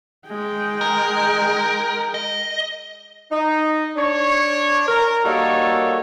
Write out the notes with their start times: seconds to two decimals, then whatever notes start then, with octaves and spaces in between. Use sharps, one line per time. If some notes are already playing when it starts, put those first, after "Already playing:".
0.28 G#3 G5
0.81 A#4
2.14 D#5
3.30 D#4
3.96 D4 C#5
4.88 A#4
5.24 G3 A#3 D#4 F#4 A4 C#5